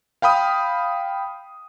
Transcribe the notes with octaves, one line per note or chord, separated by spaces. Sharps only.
F5 G5 B5 D#6